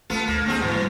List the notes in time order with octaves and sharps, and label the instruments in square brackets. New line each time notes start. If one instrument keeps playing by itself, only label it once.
[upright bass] A3 D#4 [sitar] B3 F4 A4
[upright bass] D2 [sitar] A#3
[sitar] D3 C4 G#4 [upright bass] A#3
[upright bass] G#2 [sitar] B2 E3
[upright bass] G3